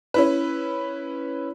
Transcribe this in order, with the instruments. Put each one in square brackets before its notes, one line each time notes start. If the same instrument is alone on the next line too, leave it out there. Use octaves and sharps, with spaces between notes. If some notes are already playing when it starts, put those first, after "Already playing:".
[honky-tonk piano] C#4 E4 B4